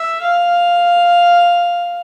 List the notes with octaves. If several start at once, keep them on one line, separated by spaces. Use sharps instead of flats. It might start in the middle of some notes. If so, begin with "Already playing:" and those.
Already playing: E5
F5